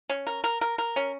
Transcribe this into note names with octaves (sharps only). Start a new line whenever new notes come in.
C#4
A#4
A#4
A#4
A#4
C#4